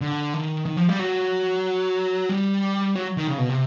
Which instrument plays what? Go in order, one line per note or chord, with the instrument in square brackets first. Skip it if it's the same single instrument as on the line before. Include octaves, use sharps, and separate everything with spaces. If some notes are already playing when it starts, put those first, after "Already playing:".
[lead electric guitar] D3
D#3
D#3
F3
G3
F#3
G3
F#3
D#3
C#3
B2
C3